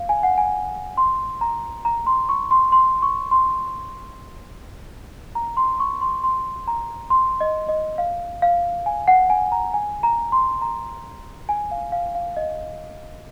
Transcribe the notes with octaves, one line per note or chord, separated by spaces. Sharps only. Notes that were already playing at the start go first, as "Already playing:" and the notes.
Already playing: F5
G#5
F#5
G#5
C6
A#5
A#5
C6
C#6
C6
C6
C#6
C6
A#5
C6
C#6
C6
C6
A#5
C6
D#5
D#5
F5
F5
G#5
F#5
G#5
A#5
G#5
A#5
C6
A#5
G#5
F5
F5
F5
D#5